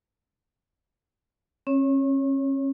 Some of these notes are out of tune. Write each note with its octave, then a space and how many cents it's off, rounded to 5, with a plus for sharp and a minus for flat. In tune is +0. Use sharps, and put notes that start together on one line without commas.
C#4 -35 C#5 +0